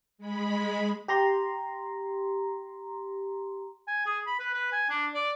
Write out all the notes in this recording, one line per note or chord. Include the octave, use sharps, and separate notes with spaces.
G#3 B5
G4 A#5 C6
G#5
G#4
B5
B4
B4
G#5
D4
D5